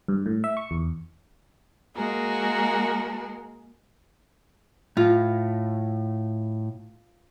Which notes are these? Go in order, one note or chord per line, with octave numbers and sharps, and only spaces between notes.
G2
A2
E5
C#6
E2
G#3 A#3 F#4 G#4 A#4
A2 F4